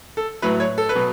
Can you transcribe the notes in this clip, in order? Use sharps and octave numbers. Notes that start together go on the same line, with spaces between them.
A4
A2 F#3 B4
C#5
A4
B4
B2 F#3